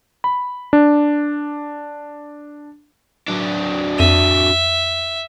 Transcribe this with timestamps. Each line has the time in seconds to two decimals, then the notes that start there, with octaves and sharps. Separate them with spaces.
0.24 B5
0.73 D4
3.29 F#3 D4
3.99 F2 E5 D#7